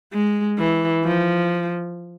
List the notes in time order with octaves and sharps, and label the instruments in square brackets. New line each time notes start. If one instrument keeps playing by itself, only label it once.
[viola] G#3
E3
F3